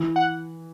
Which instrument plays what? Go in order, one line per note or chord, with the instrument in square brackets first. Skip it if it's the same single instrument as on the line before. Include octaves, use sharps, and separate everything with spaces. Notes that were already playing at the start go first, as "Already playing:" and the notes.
Already playing: [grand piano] E3
[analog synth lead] F#5